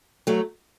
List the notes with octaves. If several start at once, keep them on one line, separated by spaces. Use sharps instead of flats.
F#3 A3